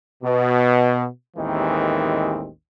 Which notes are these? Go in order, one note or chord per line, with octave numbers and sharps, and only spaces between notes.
B2
A1 D#2 D#3 E3 G#3 C4